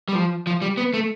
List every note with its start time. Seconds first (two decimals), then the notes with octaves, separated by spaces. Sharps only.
0.09 G3
0.15 F3
0.47 F3
0.62 G3
0.78 B3
0.94 A3